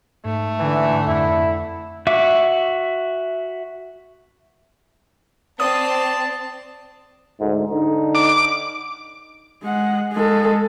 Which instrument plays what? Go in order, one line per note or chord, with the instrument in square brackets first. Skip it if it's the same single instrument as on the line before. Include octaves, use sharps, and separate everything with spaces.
[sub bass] G#2 [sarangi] A3
[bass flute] D3 [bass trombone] E3
[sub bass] F2 [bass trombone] E4
[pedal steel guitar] F#4 E5 D6
[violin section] C4 [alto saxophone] D5 [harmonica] A5 [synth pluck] D#6
[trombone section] D2 G#2
D3 D#4
[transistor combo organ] D6
[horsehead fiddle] G#3 F#5
G#3 A4